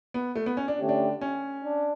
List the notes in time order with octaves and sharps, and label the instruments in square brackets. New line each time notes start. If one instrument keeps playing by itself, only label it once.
[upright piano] B3
A3
B3
C#4
D4
[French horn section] D3 A3 C#4 G4
[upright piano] D4
C#4
[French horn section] D4